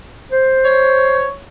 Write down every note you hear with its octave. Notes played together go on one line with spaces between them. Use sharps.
C5
C#5